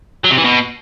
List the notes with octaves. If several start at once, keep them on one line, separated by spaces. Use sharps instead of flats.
F#3
C3
E3
B2